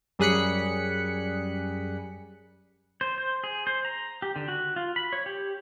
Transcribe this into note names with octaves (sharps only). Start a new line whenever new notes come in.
F#2 G3 G#4 F#6 B6 C#7
C5
C5
G#4
C5
A#5
G4
D3
F#4
F4
B5
C#5
G4